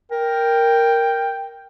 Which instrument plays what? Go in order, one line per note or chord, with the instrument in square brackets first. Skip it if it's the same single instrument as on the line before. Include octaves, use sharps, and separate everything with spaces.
[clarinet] A#4 [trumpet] G5